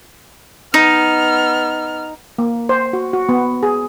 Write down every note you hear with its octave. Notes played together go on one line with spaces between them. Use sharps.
B3 D#4 F6
A#3
C5
F#4
F#4
B3
G#4